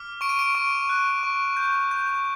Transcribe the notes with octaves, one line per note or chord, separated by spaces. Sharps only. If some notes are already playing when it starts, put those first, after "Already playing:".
Already playing: D6 F6
C#6 D7
D#7
D7
C#6
F#6
C#6
G6
G6